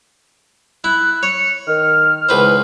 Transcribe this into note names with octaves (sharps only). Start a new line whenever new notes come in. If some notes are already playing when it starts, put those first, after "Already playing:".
E4 F#6
C#5 C#7
D#3 F6
C#2 D#3 E3 B4 C5